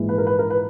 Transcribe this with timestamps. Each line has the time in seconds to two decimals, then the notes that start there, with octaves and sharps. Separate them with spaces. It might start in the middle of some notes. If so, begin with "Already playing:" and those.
Already playing: A#1 G#2 E3
0.09 B4
0.18 A#4
0.27 B4
0.39 A#4
0.50 B4